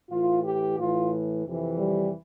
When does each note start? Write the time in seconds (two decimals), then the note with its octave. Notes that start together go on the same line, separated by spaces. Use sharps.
0.08 A2 E3 F4
0.42 G4
0.77 A2 E3 F4
1.45 F2 C3 E3
1.78 G3